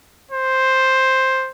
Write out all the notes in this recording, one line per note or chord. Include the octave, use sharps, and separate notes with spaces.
C5